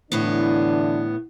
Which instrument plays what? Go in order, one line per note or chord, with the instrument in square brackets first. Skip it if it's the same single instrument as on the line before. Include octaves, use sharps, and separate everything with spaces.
[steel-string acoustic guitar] A2 B3 [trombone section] D3 E3 D4